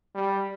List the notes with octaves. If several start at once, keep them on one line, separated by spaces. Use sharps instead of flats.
G3